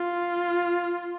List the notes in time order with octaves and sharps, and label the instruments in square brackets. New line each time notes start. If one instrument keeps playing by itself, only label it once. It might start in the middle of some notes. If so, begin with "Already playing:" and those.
Already playing: [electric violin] F4